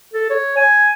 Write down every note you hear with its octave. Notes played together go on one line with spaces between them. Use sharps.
A4
C#5
G#5